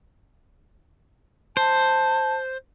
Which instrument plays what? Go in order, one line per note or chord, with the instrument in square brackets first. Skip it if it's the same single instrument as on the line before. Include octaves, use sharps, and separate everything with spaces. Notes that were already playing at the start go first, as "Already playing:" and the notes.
[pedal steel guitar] C5 [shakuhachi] A5